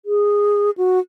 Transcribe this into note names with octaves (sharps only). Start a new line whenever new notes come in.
G#4
F#4